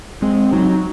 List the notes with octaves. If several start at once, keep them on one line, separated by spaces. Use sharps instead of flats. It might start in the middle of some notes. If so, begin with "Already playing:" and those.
G#3 C4
F#3 D#4